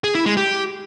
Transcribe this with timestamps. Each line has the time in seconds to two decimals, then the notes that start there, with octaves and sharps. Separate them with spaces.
0.04 G#4
0.15 E4
0.26 G#3
0.37 G4